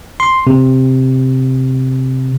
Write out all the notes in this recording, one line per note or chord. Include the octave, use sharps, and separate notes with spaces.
C6
C3